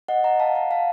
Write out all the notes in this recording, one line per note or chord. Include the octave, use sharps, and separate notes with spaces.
D#5 F#5
F#5 A#5
F5 A5
F#5 A#5
F5 A5